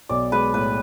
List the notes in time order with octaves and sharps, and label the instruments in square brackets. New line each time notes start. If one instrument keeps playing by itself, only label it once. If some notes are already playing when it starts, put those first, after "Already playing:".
[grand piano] B1 [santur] D5
[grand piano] G#3 [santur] B4
[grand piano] A2 [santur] B4